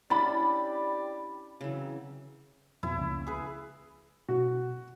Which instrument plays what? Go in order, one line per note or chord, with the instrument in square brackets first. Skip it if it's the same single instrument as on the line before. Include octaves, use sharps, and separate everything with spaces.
[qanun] C#4 D4 E4 [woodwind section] G4 D5 [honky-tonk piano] B5 A6
[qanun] C#3 E3 [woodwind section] F#3 C4
[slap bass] F2 B2 [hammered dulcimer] E4
[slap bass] C#2 A#3 C#4
[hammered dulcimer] G#4 B4
[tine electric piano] B2 [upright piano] F#4